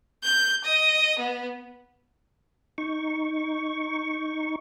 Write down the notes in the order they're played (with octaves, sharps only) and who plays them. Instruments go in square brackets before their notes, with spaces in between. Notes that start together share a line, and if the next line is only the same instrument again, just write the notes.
[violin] G6
D#5
B3
[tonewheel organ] D#4 C#6